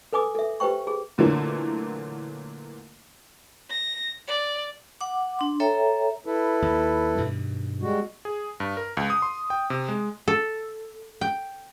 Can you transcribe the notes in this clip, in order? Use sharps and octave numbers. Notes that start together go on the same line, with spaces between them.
A4 B4 G#5 D6 D#6
A4 E5
G4 B4 C5 G5 C#6
G#4
A#2 D3 E3 F#3 A3 A#3
A#6
D5
F#5 D6
D4 C6
A4 C#5 E5 G5 A#5
E4 A4 B4
D#2
G2 B2 D#3
G3 G#3 F#4
G#4
G2
A#4
C#2
D#6
C6
G5
C3
G#3
A4
G5